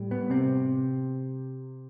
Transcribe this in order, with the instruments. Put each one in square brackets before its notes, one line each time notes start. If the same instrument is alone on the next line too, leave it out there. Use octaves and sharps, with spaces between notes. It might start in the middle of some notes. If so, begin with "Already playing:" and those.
Already playing: [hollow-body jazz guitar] A2 G3
B3
C3 C4